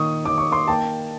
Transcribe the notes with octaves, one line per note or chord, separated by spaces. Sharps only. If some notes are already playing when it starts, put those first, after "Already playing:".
Already playing: A#2 D#3 C#6 D#6
D#3 D6
C#6
C6 D6
A#3 G5 A5